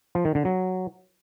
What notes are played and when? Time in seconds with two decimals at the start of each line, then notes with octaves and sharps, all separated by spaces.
0.15 F3
0.25 D#3
0.35 D3
0.45 F#3